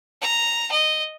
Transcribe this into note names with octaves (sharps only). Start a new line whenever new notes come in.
A#5
D#5